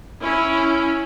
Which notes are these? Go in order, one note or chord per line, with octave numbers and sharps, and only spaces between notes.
C#4 E4